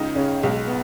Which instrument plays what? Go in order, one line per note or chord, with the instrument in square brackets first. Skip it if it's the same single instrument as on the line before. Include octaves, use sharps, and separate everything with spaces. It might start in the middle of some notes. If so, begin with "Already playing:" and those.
Already playing: [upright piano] C#2 C#3 D#4
C#3 C#4
B1 G#3
B3